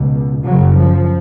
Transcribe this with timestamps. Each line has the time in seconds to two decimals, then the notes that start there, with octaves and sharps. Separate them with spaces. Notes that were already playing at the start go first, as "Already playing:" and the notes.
Already playing: C#2 B2
0.42 F#2 C#3 F#3
0.76 F3